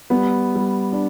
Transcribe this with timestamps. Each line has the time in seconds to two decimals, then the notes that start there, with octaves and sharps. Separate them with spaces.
0.10 G3 B3
0.56 G3
0.93 D4